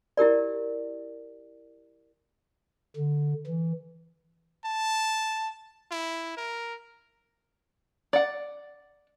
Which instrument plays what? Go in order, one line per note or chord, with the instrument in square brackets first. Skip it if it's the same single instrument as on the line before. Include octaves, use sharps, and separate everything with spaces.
[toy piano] E4 G4 A#4 D5
[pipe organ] D3
E3
[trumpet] A5
E4
A#4
[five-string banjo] D5 F#5